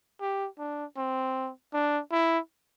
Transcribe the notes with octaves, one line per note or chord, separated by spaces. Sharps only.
G4
D4
C4
D4
E4